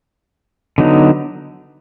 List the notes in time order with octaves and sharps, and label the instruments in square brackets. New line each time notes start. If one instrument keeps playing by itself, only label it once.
[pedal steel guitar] D3 F#3 B3 D#4